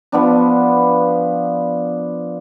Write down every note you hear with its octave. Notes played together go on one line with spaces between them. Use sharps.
F3 B3 D4